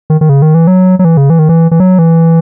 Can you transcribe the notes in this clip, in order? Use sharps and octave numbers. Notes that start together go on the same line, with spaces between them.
D#3
D#3
C#3
D#3
E3
F#3
F#3
E3
C#3
E3
D#3
E3
E3
F#3
E3